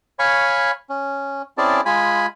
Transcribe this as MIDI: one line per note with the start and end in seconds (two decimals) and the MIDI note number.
0.19 0.71 73
0.19 0.71 77
0.19 0.71 80
0.19 0.71 83
0.19 0.71 85
0.90 1.42 61
1.58 1.81 60
1.58 1.81 61
1.58 1.81 64
1.58 1.81 68
1.58 1.81 74
1.58 1.81 81
1.86 2.26 56
1.86 2.26 65
1.86 2.26 80
1.86 2.26 83